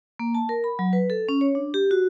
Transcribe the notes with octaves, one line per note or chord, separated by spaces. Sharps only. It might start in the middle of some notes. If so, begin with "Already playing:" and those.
A#3
A5
A#4
B5
F#3
B4
A4
C#4
C#5
D4
G4
F#4